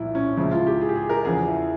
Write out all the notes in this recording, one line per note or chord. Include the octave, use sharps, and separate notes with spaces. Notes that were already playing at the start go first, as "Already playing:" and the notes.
Already playing: C2 A#2 F3 E4
C#4
C#2 C#3 F3 E4
F4
G4
G#4
G4
G#4
A#4
E2 C#3 F3 G#4
E4